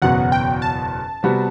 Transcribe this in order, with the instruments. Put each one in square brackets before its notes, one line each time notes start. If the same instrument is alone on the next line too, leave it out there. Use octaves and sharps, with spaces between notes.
[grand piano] F#1 E2 B2 F#3 B3 [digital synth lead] F#5
[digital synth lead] G5
A5
[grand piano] C3 G3 B3 F#4